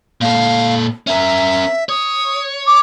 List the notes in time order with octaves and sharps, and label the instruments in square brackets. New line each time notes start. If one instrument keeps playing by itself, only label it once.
[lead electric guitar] A#2 A4 [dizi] F5
[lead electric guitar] C#4 A#4 [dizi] E5
[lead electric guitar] C#5 [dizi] D#6
[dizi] D6